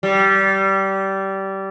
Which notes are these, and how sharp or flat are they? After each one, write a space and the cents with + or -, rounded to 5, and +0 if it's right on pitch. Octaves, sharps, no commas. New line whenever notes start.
G3 -20